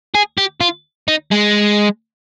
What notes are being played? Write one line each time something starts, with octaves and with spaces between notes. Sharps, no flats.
G#4
G4
F4
D#4
G#3